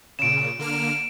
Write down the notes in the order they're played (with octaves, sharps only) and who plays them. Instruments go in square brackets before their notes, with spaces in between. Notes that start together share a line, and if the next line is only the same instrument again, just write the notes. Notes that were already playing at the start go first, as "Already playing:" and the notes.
[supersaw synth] A#2 C#3 [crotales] D7 E7
[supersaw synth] D3 A#3 F6